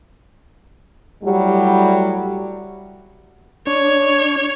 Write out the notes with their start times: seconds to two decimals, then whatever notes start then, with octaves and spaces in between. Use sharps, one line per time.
1.23 A2 F#3 G3
3.67 D4 C#5